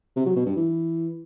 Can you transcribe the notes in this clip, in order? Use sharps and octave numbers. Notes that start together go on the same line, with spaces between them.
C3
F#3
B2
G2
E3